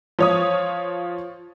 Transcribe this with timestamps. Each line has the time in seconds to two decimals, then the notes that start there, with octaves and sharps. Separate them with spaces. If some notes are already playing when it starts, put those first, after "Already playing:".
0.19 F3 C#5 D#6